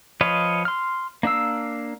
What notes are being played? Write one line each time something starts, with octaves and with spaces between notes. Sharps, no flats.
F3 B4 C#5 D#5 F5
C6 F6
A#3 D4 F5 E6